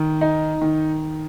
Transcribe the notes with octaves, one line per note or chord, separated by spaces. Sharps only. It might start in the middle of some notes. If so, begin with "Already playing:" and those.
Already playing: D#3
D#4
D#3